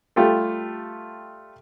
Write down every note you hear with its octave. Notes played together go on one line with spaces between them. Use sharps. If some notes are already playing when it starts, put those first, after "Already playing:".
G3 A3 F4 G4 A4